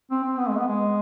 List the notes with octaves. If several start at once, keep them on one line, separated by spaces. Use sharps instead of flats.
C4
C4
B3
G#3
B3
G#3